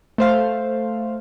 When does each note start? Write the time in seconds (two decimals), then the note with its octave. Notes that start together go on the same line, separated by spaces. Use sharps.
0.18 A3 C5 F5